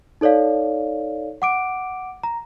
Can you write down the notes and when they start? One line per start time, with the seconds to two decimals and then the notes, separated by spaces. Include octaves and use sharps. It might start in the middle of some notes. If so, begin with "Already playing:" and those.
0.21 D#4 A4 C#5 D5 F5
1.42 F#5 D6 D7
2.23 A#5